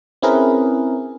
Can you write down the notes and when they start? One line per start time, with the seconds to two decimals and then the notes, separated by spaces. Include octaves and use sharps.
0.22 C4 C#4 E4 G#4 A#4 B4